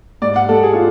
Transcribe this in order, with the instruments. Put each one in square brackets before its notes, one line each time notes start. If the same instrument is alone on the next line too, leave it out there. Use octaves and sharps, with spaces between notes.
[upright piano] G#2 D5
F#5
G#3 A4
G#4
F4